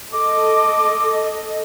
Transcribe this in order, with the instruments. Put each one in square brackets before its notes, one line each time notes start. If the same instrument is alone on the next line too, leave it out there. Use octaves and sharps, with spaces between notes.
[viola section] A4 D#5 [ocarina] D6